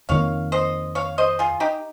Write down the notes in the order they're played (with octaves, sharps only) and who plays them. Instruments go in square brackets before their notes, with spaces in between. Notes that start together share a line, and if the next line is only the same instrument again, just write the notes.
[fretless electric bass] F2 D#3 A#3 [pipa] C#5 F5
[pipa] C5 D#5
C#5 F5
C5 D#5
F4 G#4
D#4 G4